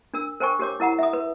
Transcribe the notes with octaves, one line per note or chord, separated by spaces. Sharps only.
D4 A#4 E6
A#4 C5 G5 G#5 C#6
G4 A#4 C#5 D6
E4 A#4 F#5 A#5
E5 D#6
B4